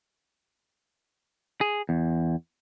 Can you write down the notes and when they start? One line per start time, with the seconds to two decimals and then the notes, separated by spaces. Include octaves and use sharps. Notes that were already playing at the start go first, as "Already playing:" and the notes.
1.61 G#4
1.89 E2